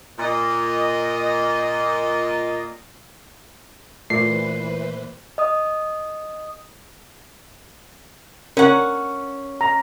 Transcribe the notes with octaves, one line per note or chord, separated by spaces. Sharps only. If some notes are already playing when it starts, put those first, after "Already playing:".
A#2 D#5
A#2 E3 A3 B4 C5 C7
D#5 D#6
C#4 A#4 F#5
A#5